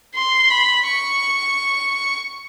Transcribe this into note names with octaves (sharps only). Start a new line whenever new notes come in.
C6
B5
C#6